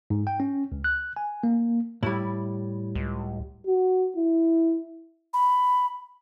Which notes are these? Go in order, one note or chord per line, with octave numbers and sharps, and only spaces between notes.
G#2
G5
C#4
C#2
F#6
G#5
A#3
A2 G3 E4
C#2
F#4
E4
B5